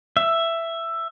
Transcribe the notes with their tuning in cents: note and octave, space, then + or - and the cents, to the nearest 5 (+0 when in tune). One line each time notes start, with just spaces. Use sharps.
E5 +10